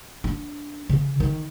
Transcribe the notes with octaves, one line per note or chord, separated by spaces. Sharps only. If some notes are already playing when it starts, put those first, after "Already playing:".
D4
C#3
D#3